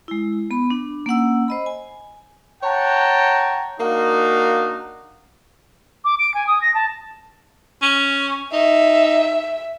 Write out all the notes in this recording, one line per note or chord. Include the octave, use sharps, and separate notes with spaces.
G#3 E4
B3 B5
D4
A#3 C#4 F#5 E6
C5 D#5 B5
G#5
C#5 F#5 G5 A5 A#5
A#3 D4 D#4 F#4 F5
D6
D7
G#5
D#6
A#6
A5
C#4
D#4 E5